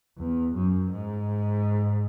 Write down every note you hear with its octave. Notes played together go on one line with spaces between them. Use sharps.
E2
F#2
G#2